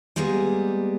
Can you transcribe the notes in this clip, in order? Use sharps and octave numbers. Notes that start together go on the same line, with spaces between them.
G3 G#3 A#3 B3 G#4